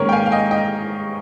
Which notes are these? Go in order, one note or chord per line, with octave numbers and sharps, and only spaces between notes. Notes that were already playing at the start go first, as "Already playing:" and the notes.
Already playing: G#2 D#3 A#3 C#4 A#4 C#5
G5
F5 G#5
F5
D#5 G5
D#5 G5